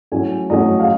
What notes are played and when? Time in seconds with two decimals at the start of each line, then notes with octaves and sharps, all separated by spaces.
0.12 A2 F#3 A3 C#4 G#5
0.50 A2 F#3 A3 C#4 D#5
0.80 F5